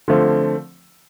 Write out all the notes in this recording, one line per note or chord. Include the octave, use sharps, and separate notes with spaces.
D3 F3 A3 C4 F4